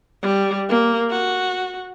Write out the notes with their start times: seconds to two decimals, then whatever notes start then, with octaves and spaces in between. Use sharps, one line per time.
0.22 G3
0.69 A#3
1.10 F#4